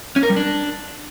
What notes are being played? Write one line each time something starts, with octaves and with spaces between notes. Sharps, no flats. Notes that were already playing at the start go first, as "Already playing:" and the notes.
C#4
A#4
G3
D4